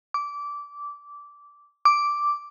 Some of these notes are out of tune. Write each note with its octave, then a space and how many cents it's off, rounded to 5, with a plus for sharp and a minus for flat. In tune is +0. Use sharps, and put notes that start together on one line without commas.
D6 -15
D6 -5